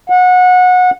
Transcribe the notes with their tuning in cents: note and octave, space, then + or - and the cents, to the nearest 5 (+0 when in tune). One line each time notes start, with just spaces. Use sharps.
F#5 -25